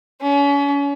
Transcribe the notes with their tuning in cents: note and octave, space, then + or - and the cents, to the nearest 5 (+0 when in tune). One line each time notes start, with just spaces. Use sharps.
C#4 +35